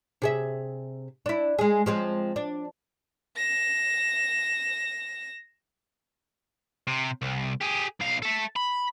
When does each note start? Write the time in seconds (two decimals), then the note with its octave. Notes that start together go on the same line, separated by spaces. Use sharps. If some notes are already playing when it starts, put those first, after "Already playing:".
0.22 C3 G#4 E5
1.26 D4 E4
1.59 G#3 G#4
1.86 F3 G#3 C4
2.36 D4
3.37 A#6 E7
6.87 C3
7.22 C2
7.61 G4 G#4
8.00 B1 F5
8.22 A4 E5
8.56 B5